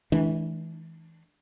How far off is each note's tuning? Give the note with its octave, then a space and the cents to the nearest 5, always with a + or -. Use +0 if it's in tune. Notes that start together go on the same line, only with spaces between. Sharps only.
E3 -20 G#3 +45 D4 +0